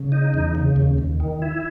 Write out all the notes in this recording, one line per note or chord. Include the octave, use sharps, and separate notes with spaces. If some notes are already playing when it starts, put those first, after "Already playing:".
Already playing: C#3
D#4
E2
C#3
D#2
D#2
D#3
E4